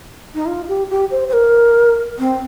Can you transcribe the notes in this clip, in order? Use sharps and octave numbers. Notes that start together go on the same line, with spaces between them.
D#4
F4
G4
G4
C5
C5
A#4
C4